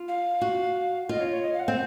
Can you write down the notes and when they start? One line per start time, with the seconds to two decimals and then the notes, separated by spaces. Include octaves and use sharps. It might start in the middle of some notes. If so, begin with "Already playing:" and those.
Already playing: F4
0.08 F5
0.41 F#4
1.09 F4 D#5
1.20 C#5
1.31 C#5
1.43 D#5
1.53 F5
1.59 F#5
1.65 C4 F5